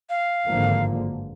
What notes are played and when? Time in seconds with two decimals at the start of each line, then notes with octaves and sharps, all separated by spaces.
0.10 F5
0.45 G#1 G2 D3 F3 A#3